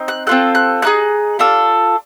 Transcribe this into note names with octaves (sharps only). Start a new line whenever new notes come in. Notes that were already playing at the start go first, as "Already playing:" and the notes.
Already playing: C4 D#4
F#6
C4 F4 A4 F#6
F#6
A#3 D#4 G#4 F#6
D4 F4 A4